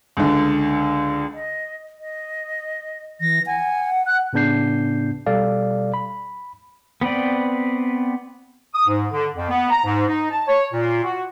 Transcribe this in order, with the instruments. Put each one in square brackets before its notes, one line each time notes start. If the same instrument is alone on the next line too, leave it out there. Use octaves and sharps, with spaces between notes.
[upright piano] C#2 D3
[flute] D#5
D#5
[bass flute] E3 [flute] A#6
[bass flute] F#5 [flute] G#5
[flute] F#6
[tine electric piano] A2 C#3 B3 D4 G6 C7
B2 G3 A4 D5 F5
B5
[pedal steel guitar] B3 C4 B4 D5
[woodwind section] D#6
G#2
D3
F2
B3
A#5
G#2
D#4
A5
C#5
A#2
F#4